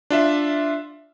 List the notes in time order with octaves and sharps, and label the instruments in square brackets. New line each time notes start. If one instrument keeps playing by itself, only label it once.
[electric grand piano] D4 F4 E5